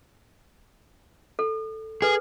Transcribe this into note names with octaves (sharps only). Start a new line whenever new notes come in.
A4
G#4 A4 B4